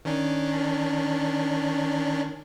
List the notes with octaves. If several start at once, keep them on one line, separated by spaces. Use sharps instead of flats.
D#3 C#4 D4